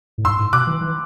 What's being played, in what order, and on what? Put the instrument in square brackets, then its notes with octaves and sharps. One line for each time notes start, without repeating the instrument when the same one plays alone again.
[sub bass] A2
[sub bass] G2 [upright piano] C6 E6
[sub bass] A2
[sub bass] B2 [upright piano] D6 F#6
[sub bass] E3
E3